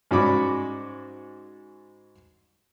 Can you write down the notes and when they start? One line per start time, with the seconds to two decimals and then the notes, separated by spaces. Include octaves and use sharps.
0.11 G#2 C#4 F#4 D5 B5 D6